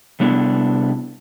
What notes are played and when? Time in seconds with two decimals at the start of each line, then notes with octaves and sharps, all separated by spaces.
0.20 C3 G3 B3 D4 E4 A4